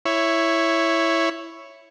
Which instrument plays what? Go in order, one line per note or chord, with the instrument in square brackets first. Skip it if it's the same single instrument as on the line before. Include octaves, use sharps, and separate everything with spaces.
[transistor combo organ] E4 C#5